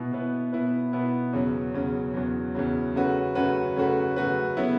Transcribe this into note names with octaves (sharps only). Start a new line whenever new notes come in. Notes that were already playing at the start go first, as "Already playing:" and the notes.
Already playing: B2 B3 E4 B4
B2 B3 E4 B4
B2 B3 E4 B4
B2 B3 E4 B4
E2 C#3 F#3
E2 C#3 F#3
E2 C#3 F#3
E2 C#3 F#3
F#2 C#3 A3 F#4 B4
F#2 C#3 A3 F#4 B4
F#2 C#3 A3 F#4 B4
F#2 C#3 A3 F#4 B4
C#3 F#3 B3 E4